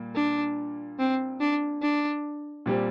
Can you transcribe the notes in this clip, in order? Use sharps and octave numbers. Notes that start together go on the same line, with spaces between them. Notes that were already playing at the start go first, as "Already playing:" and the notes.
Already playing: A#2 G3 A#3
D4
C4
D4
D4
A#2 G3 C4 G4